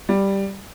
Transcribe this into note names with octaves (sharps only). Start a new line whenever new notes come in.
G3